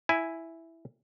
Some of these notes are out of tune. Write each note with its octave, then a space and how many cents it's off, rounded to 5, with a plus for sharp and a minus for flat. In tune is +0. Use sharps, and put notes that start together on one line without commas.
E4 +0 G#5 +0